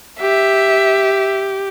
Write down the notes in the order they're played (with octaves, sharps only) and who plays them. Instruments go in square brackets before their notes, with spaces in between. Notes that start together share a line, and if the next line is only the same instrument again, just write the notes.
[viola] G4 [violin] E5